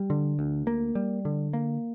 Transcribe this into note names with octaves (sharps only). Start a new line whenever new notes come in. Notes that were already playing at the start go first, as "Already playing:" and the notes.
Already playing: G3
D3
D2
A#3
G3
D3
A#3